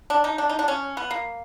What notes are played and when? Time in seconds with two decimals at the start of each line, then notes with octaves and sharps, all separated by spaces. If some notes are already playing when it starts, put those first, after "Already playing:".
0.10 D4
0.24 D#4
0.38 D4
0.49 D#4
0.59 D4
0.68 C#4
0.97 B3
1.11 A#3